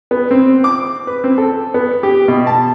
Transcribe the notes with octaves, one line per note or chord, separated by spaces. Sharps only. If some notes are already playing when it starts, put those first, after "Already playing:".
B3
C4
D6
B4
C4
A4
B3
G4
B2
A5